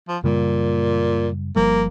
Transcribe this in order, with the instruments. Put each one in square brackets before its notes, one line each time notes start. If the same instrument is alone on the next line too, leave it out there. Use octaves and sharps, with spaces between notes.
[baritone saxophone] F3
[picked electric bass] F#2 C#3 G3 [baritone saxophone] A#2
[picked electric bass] G1 F3 G3 [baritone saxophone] A#3